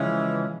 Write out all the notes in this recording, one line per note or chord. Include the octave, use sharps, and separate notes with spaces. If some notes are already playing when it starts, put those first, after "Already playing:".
Already playing: C#3 E3 F3 G#3 C#4